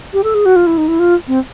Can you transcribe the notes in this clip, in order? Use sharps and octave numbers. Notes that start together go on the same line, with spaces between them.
G4
A4
G#4
F#4
F4
E4
D#4
E4
F4
C4